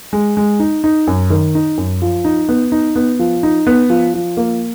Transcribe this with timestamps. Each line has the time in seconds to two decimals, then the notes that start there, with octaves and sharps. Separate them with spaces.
0.13 G#3
0.37 G#3
0.60 D#4
0.84 D#4
1.07 F#2
1.30 D#3
1.55 D#4
1.77 F#2
2.02 F3
2.25 D#4
2.49 B3
2.72 D#4
2.96 B3
3.19 F3
3.43 D#4
3.67 B3
3.90 F3
4.14 F3
4.37 A#3